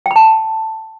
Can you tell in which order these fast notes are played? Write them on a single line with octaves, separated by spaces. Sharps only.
G5 B5 A5